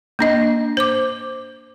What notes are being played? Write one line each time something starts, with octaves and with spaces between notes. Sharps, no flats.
A#3 D4 D#5
C5 D6